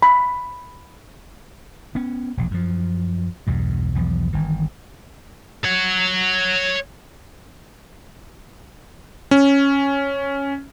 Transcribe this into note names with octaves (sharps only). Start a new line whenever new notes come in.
B5
B3 C#4
E1 A#1
F#2 F3
B1 E2 G2
B1 E2 F3
G1 D#3 E3
C#5 F#5
C#4